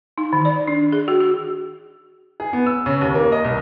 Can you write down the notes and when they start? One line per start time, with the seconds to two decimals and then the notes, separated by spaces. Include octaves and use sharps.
0.18 D#4
0.33 D#3
0.45 D5
0.68 D4
0.92 G#4
1.08 F#4
1.20 F#4
2.40 G#4
2.53 B3
2.67 E6
2.86 C#3
3.01 D#2
3.15 A#3
3.32 D#5
3.44 C2